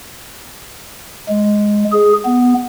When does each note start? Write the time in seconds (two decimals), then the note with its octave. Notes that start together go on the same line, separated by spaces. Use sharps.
1.29 G#3
1.93 G#4
2.25 B3